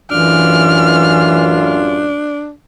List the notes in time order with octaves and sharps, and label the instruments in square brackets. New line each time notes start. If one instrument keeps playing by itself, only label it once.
[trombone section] A1 F#2 F4 [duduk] E3 [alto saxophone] D4 [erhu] F6